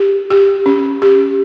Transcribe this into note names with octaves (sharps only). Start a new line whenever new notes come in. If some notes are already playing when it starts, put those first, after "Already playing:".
Already playing: G4
G4
C#4
G4